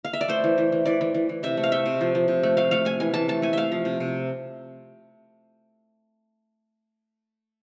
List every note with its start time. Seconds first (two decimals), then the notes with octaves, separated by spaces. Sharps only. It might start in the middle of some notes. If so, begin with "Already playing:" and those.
0.05 F5
0.13 E5
0.21 D5
0.28 A3 C5
0.44 E3
0.58 E3
0.72 E3
0.85 E3 D5
1.01 E3
1.15 E3
1.29 E3
1.43 C3 E5
1.57 A3
1.63 F5
1.72 A3 E5
1.86 C3
2.01 F3
2.15 F3
2.28 C3
2.43 A3
2.57 A3 F5
2.71 A3 F5
2.85 A3 G#5
3.00 E3 G#5
3.14 E3 A5
3.28 A3 A5
3.42 A3 G#5
3.53 A3 E5 F5
3.72 F3
3.85 C3
4.00 C3